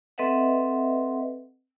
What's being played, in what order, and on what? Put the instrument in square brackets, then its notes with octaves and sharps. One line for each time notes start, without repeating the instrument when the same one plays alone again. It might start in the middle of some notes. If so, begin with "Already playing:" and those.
[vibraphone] C4 A4 B4 D#5 E5 F#5